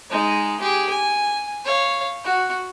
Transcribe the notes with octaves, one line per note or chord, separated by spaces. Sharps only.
G#3 D#4
G4 G#4
G#5
C#5 F5
F#4 F#5